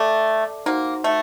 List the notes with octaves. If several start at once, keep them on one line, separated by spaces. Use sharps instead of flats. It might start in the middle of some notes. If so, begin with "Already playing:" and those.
Already playing: A3 A4 D5 A5 D6
A#3 D#4 F#4 C5 F#5 C6
A3